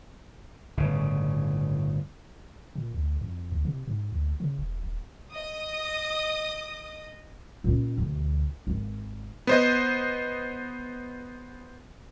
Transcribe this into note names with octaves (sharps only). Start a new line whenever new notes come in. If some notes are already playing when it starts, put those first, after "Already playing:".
G1 A2 C#3
A#2
D2
F2
D2
C3
G#2
D2
C#3
E1
D#1
D#5 D#6
A#2 C#4
D2 B2
G#1
B3 C5 D#5